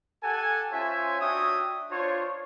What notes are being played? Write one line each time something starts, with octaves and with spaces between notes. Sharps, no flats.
G4 A4 F#5 G#5
C#4 F4 C5 C#5 E5 G#5
D4 F#4 C#5 E5 G5 D#6
D4 F4 C5 C#5